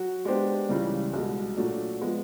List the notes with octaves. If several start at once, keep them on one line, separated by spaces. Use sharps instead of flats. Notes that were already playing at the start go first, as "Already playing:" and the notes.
Already playing: F#3 F#4
G#3 B3 D4 G4 C5
C#2 C#3 E3 G3
C2 B2 G#3
A#2 F#3 A3 D4
F3 G#3 B3